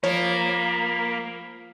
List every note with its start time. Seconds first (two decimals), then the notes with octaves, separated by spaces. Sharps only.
0.04 F3 A#3 C#5 B5